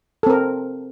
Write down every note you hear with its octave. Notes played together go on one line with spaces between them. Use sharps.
C4 A4 A#4